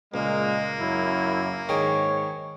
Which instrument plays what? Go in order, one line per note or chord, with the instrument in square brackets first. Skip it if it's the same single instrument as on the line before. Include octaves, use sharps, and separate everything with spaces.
[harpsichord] C#2 [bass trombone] A#2 [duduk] G#3 [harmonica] A#3
[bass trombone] F#2 [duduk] E4
[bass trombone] G#2 [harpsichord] D#3 G#4 G5 [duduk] C#5